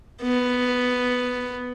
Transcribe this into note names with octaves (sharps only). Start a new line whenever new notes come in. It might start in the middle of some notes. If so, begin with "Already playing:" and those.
B3